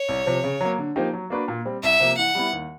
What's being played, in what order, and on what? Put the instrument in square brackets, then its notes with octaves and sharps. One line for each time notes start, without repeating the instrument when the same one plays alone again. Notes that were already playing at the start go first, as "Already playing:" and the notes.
Already playing: [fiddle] C#5
[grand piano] C2
C3 F3
C#3
F#3 A#3
D3
F3 A#3 D#4 G4
F#3
A#3 D4 F#4 B4
A#2
G3 C4
[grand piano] C2 [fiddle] E5
[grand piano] C3 F3 A#3
[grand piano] E3 [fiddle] F#5
[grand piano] G3 B3 E4
D#2